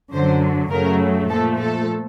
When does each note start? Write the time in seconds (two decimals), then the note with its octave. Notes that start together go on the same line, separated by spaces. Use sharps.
0.13 F#2 D3 F#3 C5
0.70 F#2 C#3 F#3 A3 A#4
1.29 A#2 F3 A3 A4
1.57 A4